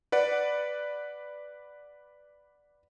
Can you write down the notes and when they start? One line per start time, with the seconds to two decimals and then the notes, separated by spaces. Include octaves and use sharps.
0.12 B4 D5 F#5